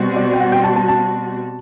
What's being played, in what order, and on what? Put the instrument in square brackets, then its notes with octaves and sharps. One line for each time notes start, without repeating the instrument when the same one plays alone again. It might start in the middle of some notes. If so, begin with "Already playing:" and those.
Already playing: [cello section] B2 G3 C4 F#4
[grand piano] D5
G5
F#5
G5
A5
A5
A5